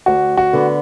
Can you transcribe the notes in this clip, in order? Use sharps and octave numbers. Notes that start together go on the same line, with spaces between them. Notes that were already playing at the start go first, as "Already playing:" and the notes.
D2 F#4
F#4
D3 B3